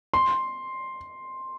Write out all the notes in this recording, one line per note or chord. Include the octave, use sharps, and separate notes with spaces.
C6